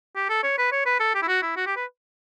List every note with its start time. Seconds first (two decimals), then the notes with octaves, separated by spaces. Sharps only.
0.16 G4
0.29 A4
0.43 C#5
0.58 B4
0.72 C#5
0.86 B4
1.00 A4
1.15 G4
1.23 E4
1.28 F#4
1.42 E4
1.57 F#4
1.67 G4
1.76 B4